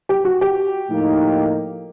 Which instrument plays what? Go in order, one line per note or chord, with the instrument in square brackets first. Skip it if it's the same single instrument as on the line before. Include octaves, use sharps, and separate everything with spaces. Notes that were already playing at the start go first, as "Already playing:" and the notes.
[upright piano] G4
F#4
G4
[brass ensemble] A2 F3 A#3 D#4